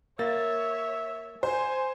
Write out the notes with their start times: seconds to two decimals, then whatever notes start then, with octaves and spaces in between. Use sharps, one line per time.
0.19 A#3 C#5 E5 A6
1.43 C5 G#5